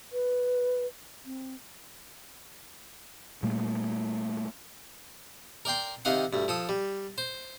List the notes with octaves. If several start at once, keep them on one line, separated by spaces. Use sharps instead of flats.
B4
C4
A#2 G3 A3 A#3
A#4 D5 G5 C6
C3 D#3 D#5 F5 F#5
D2 G2
F3 A4 D#6
G3
C5